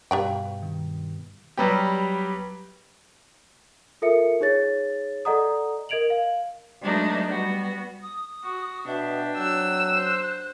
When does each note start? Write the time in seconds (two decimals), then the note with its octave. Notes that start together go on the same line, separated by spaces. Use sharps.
0.11 G2 B2 G4 D5 F5 G5
0.62 D#3
1.57 F#3 G3 B3 G4
4.02 F4 A4 A#4 E5 C#7
4.41 D#4 G#4 C#5 A6
5.25 A4 D5 D#5 F#5 A#5 D#6
5.89 A#4 D#5 G#6 D7 F7 F#7
6.10 F5
6.80 F#3 G#3 A3 B3 D4 D#4
7.27 G3 B3 F#4
8.02 D#6
8.43 F#4
8.87 B2 D4 E5 G5
9.38 F#3 E6 F#6
9.94 C5